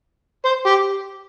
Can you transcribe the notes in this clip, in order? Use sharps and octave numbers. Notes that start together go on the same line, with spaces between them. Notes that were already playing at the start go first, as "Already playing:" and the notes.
C5
G4